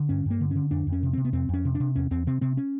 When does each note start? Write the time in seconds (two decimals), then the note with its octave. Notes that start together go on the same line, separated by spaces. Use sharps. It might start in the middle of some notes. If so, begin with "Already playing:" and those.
Already playing: D3
0.09 G2 C#4
0.26 G2 A#3
0.41 D3
0.51 D3 C#4
0.71 F2 D4
0.87 F2
0.92 C#4
1.03 C3
1.13 C3 C4
1.25 B3
1.33 F2 C4
1.49 F2 C#4
1.65 C3
1.75 D4
1.80 C3
1.95 E2 C#4
2.11 E2 C4
2.27 C3 C4
2.41 C3 C4
2.57 C#4